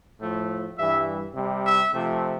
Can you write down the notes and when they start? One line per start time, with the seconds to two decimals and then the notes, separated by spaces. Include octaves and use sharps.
0.20 A2 F3 A3
0.77 G2 E3 G3 E5
1.35 C3 G3
1.65 E5
1.94 C3 F3 A3